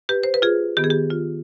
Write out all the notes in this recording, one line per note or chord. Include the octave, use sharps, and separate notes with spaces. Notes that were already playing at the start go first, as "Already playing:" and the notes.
G4 B4
C5
B4
F4 G#4
D#3 B3 G4
G#4
G4
F4